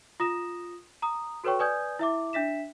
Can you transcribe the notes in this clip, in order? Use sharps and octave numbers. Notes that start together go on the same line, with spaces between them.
F4 D#6 A#6 E7
A#5 D#6
F#4 A4 B4 C#5 G5 C#6
B4 D5 G#5 D#6 G6 G#6
E4 E5 D6
D4 E5 B6 E7